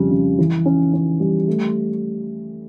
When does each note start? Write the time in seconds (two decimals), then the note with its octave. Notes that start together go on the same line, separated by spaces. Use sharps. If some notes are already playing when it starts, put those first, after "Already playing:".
Already playing: F2 C#3 G3
0.11 C#3
0.39 E3
0.66 C#4
0.94 C#4
1.20 G3
1.48 A3